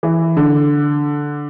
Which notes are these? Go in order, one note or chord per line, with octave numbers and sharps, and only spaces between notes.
E3
D3